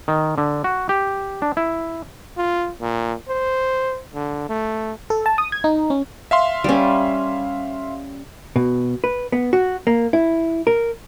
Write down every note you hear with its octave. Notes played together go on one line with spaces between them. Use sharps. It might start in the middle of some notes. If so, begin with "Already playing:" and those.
D#3
D3
F#4
G4
D4
E4
F4
A#2
C5
D3
A3
A4
A5
D#6
G#6
D#4
C#4
E5 F5 C6
G3 C#4
B2
B4
B3
F#4
A#3
E4
A#4